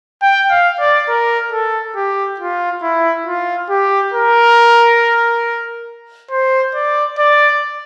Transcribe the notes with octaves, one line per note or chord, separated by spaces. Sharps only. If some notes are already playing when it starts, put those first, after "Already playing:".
G5
F5
D5
A#4
A4
G4
F4
E4
F4
G4
A#4
C5
D5
D5